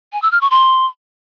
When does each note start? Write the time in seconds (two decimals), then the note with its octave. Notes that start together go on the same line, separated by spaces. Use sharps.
0.13 G#5
0.22 E6
0.32 F6
0.41 C#6
0.51 C6